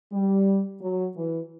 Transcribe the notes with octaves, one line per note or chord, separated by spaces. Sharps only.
G3
F#3
E3